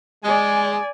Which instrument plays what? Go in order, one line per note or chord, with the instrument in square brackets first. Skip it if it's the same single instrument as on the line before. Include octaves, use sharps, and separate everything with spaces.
[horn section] G#3 [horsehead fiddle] D5 G#5